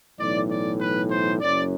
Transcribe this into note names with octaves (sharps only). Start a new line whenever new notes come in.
B1 A2 E3 D5
D5
B4
C5
F#1 F#2 F#3 D5